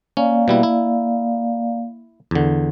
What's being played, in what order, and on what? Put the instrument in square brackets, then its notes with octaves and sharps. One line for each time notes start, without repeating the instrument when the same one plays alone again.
[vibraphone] A#3 D5 F5 [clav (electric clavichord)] C#4
[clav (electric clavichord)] B2 G3 E4
E4
E2 D3